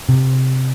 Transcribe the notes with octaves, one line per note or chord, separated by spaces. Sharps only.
C3